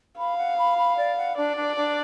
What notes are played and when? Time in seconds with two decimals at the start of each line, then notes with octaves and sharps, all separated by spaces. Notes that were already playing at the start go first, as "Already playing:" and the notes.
0.18 F5 B5
0.38 F#5
0.58 B5
0.78 B5
0.97 D5
1.17 F#5
1.37 D4 D5
1.57 D4
1.76 D4